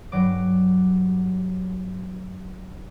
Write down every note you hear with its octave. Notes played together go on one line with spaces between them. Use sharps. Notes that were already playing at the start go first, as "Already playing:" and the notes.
G2 F#3 D6